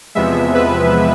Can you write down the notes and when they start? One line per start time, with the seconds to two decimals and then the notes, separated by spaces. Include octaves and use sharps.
0.15 E2 C3 F3 G#3 B3 E5
0.54 B4